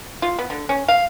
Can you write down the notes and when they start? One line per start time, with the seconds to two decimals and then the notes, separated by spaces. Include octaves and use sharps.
0.22 F4
0.39 B3
0.50 D3
0.69 C#4
0.88 F5